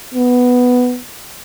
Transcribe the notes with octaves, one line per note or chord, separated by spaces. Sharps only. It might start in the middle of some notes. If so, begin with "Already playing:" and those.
B3